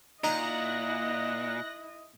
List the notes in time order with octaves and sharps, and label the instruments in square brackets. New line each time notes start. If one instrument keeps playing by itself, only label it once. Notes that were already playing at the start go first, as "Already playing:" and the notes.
[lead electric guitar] A#2 [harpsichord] D#4 A#5 [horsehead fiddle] E4 D#5 [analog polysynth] F#6 A#6